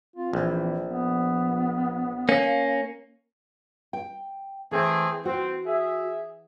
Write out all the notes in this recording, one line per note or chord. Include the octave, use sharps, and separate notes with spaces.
C4 F4
A#1 E3
F3 B3
A#3 C#4 F5
G5
E3 A3 C4 G#4
C4 F#4
G#4 E5